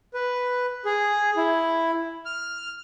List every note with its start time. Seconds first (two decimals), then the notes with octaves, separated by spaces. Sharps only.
0.14 B4
0.85 G#4
1.37 E4
2.25 F6